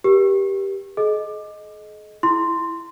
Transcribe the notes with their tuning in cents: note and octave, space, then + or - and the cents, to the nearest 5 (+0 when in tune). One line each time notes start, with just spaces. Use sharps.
G4 +0 A#4 +40
G#4 +45 D#5 +0
E4 +0 C6 -5